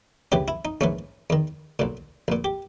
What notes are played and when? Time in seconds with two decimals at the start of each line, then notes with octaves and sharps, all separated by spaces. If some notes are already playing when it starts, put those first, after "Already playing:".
0.32 C#2 C#3 E3 G4
0.48 E4
0.65 D#4
0.81 A#1 G#2 E3 C#4
1.30 E2 D#3
1.79 B1 A#2
2.28 A#1 A#2
2.44 G4